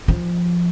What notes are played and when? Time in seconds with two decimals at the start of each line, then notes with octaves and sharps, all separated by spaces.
0.08 F3